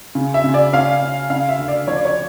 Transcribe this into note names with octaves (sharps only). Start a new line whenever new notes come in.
C#3
E5
C#3
D5
C#4 F5
C#4
C#3 F5
E5
D2
D5
F3 C#5
D5
C#5